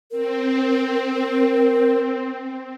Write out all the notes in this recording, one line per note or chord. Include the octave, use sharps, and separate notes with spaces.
C4 A#4